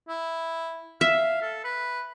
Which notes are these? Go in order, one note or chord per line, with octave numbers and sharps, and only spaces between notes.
E4
E5 F5
A4
B4